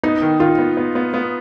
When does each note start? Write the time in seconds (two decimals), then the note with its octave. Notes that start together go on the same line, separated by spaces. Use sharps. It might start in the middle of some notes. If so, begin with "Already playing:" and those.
0.03 B3 D#4
0.22 D#3
0.40 D#3 F4
0.58 B3
0.77 B3
0.95 B3
1.14 B3